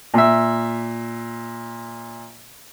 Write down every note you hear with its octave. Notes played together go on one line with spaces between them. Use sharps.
A#2 E5